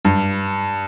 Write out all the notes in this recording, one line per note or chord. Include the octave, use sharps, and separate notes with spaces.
G2